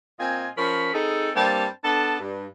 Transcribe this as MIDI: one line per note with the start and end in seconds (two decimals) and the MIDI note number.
0.19 0.49 46
0.19 0.49 60
0.19 0.49 65
0.19 0.49 75
0.19 0.49 80
0.57 0.91 53
0.57 0.91 61
0.57 0.91 70
0.57 0.91 73
0.57 0.91 83
0.94 1.31 60
0.94 1.31 63
0.94 1.31 68
0.94 1.31 69
1.36 1.66 43
1.36 1.66 55
1.36 1.66 58
1.36 1.66 60
1.36 1.66 81
1.84 2.15 59
1.84 2.15 62
1.84 2.15 69
1.84 2.15 81
2.20 2.46 43